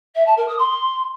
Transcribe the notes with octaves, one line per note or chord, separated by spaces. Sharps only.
E5
A5
A#4
D#6
C6